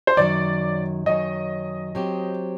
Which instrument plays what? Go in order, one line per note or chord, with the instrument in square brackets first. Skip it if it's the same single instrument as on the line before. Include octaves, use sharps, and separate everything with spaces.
[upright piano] C5
[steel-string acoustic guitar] F#2 D#3 F#3 [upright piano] D5
[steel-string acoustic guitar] F#2 D#3 F#3 [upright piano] D#5
[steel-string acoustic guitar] F#3 C4 G4